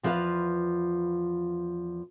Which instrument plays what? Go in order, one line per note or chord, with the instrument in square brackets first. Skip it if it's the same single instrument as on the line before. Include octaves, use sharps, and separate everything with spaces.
[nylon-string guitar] E2 F3 F4 G#4 B4 F5